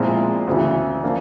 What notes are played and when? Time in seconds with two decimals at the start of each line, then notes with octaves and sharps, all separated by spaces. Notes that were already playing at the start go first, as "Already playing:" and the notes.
Already playing: A#2 F3 G#3 C4 E4
0.47 D2 C#3 E3
1.03 F3 A#3 D4